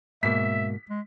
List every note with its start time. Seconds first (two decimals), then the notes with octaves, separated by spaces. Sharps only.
0.23 G#2 B2 A#3 E5 B6
0.90 G#3